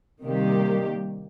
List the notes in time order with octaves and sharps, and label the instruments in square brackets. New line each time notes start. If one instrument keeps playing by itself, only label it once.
[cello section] C3 D#3 G3 A#3 G4